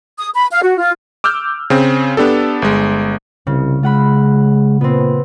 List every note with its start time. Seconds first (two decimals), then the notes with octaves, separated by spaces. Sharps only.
0.18 D#6
0.34 B5
0.50 F5
0.63 F#4
0.78 F4
1.24 D6 E6 F6 G6
1.70 C#3 C4
2.17 B3 D4 G4 A4
2.62 G1 G#3
3.47 C2 C#3
3.83 G#3 F4 F#5 B5
4.81 A#2 B3 C4